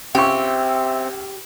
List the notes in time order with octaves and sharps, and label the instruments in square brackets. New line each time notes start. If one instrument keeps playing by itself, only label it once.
[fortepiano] C#2 C#6 [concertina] C4 [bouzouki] G4 [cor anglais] E5